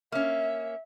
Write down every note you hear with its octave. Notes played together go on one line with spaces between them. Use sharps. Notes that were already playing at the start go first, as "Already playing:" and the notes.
A#3 C#4 E5